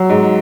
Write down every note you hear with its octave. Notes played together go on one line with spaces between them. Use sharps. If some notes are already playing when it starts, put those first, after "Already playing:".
Already playing: F#3
G#2